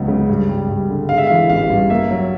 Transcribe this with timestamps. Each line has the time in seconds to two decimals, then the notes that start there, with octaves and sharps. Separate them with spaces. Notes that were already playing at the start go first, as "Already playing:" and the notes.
Already playing: C#2 F#3 B3
0.08 C#3
0.29 G2
0.49 G3
0.69 G2
0.89 D3
1.09 G#3 F5
1.18 E5
1.27 F5
1.30 E3
1.49 A1 F5
1.70 G2
1.90 A#3 E5
2.11 F#3